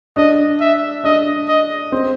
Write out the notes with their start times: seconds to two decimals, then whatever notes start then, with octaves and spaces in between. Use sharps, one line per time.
0.16 D4 D#5
0.61 E5
1.04 D4 D#5
1.48 D#5
1.92 C4